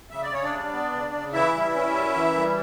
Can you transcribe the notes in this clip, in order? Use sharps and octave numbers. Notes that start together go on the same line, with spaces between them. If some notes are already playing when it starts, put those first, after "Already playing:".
C#3 E5
D5
C#3 C#5
D4 D5
G3
B3
C#3
C#3
E3 E4 E5
G3
C#4
F#2
E3
G3